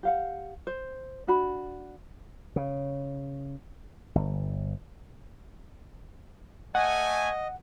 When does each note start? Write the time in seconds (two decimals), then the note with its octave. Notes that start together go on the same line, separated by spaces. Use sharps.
0.03 G4 F5 F#5
0.67 C5
1.27 D4 F#4 B5
2.56 C#3
4.15 G1
6.75 A3 D#5 F#5 G#5